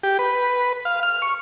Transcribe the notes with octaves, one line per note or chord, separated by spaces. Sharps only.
G4
B4
F5
F6
C#6